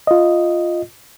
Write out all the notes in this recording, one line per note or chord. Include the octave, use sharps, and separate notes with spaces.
F4 D#5